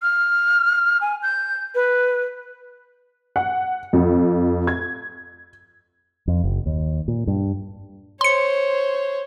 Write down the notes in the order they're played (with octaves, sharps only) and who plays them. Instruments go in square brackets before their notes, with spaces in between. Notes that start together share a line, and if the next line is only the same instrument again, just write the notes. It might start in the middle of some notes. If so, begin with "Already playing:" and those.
[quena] F6
G#5
G6
B4
[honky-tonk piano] F#5
F2
G#6
[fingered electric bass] F2
F#1
D#2
A#2
G2
[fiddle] C5 C#5 [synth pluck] C6 C#7